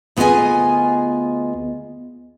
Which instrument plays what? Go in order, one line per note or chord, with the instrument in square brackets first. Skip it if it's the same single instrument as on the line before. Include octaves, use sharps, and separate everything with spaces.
[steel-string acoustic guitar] D2 B3 F4 G#4 D#5 G#5